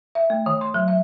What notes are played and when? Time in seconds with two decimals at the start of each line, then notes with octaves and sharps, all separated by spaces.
0.15 E5
0.30 A3
0.46 D#3
0.61 C6
0.74 F#3
0.88 E5